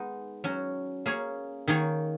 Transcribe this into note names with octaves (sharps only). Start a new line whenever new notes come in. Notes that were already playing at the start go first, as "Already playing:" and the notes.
Already playing: G#3 B3 D#4
F#3 C#4 F#4
A#3 C#4 G#4 C#5
D#3 A#3 D#4 G#4 C#5